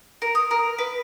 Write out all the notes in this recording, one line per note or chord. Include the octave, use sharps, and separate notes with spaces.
A#4
D#6
A#4
B4